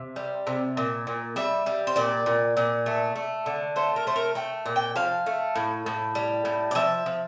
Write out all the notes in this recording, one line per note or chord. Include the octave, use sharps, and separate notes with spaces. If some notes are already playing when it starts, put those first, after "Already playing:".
Already playing: C3
G3
C3
A#2
A#2
G3 E5
G3
C5
A#2 D5
A#2
A#2
A3
A3
D3
A3 C5
A#4
A3 C5
A#4
A3 G5
A#2
G5
F3 F5
A3
A2
A2
G3
A2
D5
F3 E5
F3